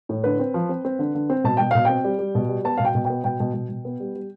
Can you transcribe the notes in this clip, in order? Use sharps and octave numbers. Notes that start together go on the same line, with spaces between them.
A2
D3 B4
C4
F3
C4
C4
D3
D3
C4
B2 A5
B2 G5
B2 F5
C4 G5
G3
G3
B2
G3
B3 A5
B2 F5
G5
B2
G5
B3
B2 G5
B2
B2
B2
B3
G3
G3